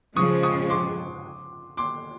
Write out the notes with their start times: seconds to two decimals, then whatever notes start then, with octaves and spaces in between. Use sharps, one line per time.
0.16 C#3 F3 G#3 C#6 D#6
0.43 C#6 D#6
0.70 C6 D6
1.77 C6 D6